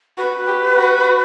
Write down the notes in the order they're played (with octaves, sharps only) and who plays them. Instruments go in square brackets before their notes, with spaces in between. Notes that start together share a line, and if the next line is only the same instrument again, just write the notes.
[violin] F#4 [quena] B4
[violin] G4
F#4